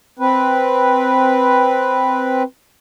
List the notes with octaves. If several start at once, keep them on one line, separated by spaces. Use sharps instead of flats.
C4 B4